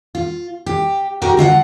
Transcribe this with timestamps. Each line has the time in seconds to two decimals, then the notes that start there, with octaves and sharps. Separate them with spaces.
0.15 F4
0.66 G4
1.22 D#4 F#4 G4 A#4
1.37 D3 F4 D#5 F#5